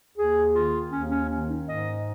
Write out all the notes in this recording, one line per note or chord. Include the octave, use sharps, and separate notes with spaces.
D#2 G#4
D#3 F4
D#2 C#4
C#4
D#3 C#4
D#4
G#2 D#5